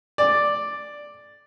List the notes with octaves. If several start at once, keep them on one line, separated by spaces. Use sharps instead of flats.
D5